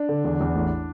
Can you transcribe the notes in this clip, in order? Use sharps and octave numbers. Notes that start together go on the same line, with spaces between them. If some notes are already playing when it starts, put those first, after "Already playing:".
Already playing: D4
D3
E2
E2
A1